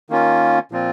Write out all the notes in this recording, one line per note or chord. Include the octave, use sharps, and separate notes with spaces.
D#3 A#3 C#4 F4
A#2 F3 C4 F4